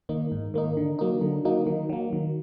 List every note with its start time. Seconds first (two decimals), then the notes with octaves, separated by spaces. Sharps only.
0.09 D#3 A#3 D#4
0.32 G#2
0.54 D#3 A#3 D#4
0.77 D3
0.99 F#3 A#3 D#4
1.21 D3
1.45 F#3 A#3 D#4
1.67 D#3
1.89 F#3 A#3
2.13 D#3